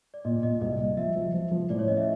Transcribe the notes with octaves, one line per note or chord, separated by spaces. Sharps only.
D5
A#2 D#5
A#2 D#5
C2 D#5
C2
F3 E5
F3
F3
F3
A2 D5
C#5
C#4 D#5
E5